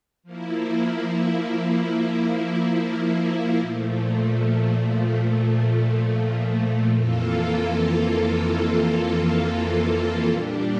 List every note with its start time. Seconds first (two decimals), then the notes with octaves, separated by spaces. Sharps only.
0.23 F3 A#3 E4
3.58 A#2 F3 A3
6.93 F2 E3 A#3 F4 A4
10.27 A#2 G3 D4 G4